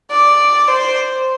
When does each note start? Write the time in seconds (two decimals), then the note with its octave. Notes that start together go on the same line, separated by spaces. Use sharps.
0.11 D5
0.68 C5